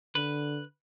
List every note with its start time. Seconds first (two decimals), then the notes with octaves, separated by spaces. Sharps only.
0.15 D3 B4